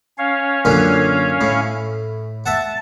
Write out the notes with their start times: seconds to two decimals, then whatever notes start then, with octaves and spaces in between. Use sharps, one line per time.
0.18 C#4 C#5 F5
0.65 F#2 A#2 D3
1.41 A2
2.46 E5 F#5 A5